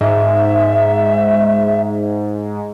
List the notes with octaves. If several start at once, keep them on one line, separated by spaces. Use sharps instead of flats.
G#2 E5